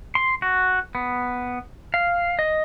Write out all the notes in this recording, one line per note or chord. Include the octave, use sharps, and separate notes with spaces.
C6
F#4
B3
F5
D#5